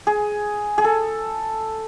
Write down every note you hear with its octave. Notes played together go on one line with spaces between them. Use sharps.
G#4
G#4
A4